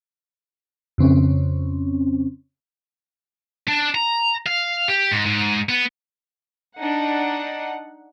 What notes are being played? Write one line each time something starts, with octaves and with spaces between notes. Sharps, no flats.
F2 C#3 C4 C#4
D4
A#5
F5
G4
G#2
G#2
B3
D4 D#4 F#5